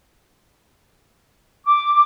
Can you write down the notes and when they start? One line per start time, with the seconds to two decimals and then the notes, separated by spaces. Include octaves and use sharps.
1.66 D6